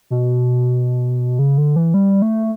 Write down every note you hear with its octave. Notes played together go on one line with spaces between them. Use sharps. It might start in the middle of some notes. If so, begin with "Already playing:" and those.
B2
C#3
D3
E3
G3
A3